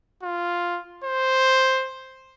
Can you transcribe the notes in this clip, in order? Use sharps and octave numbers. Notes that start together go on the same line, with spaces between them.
F4
C5